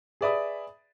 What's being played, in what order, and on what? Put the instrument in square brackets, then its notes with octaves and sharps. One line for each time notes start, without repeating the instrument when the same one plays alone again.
[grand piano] G#4 B4 D5 E5 B5 D#6